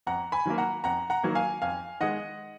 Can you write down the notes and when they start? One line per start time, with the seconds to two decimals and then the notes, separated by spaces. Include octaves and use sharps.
0.07 F2 F#5 A#5
0.32 G#5 B5
0.46 D#3 F#3 A#3
0.58 F#5 A#5
0.84 F2 F#5 A#5
1.10 F#5 A#5
1.23 D#3 F#3 A#3
1.35 F5 G#5
1.62 F2 F5 G#5
2.01 D#3 G#3 D#5 F#5